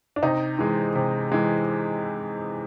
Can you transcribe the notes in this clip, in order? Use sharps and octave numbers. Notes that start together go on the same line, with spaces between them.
D4
C3 D#4
E3 G#3
C3
E3 G#3